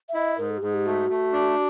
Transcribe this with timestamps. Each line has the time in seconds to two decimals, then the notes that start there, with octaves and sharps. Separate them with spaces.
0.09 E5
0.14 E4 D#5
0.38 G#2 A#4
0.50 A4
0.57 G4
0.61 G#2 G#4
0.74 G4
0.86 A3 F#4
1.10 A3
1.33 D4